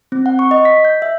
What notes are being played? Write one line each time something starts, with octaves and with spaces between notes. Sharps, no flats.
C4
F#5
C#6
D#5
B6
G6
E5